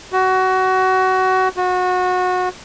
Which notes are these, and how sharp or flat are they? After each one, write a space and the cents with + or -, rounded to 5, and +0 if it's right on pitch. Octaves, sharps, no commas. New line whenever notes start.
F#4 +20
F#4 -25